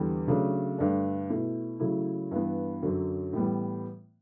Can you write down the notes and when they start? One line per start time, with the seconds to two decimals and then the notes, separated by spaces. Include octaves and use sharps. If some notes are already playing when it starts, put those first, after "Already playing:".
Already playing: E2 D3 G3
0.27 C#3 F#3 A3 D4
0.78 G2 D3 A3 D4
1.30 B2 A3 E4
1.80 C#3 F#3 A3 E4
2.31 G2 E3 B3
2.82 F#2 D3 F#3
3.33 A2 E3 G3 B3